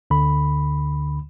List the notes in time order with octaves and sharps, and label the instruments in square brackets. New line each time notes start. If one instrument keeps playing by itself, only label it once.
[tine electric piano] D2 D3 B5